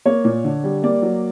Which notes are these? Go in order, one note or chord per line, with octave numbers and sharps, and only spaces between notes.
A#3 C#5
A#2
D3
G3
A#3 D5
F#3